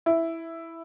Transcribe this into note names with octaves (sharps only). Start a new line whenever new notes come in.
E4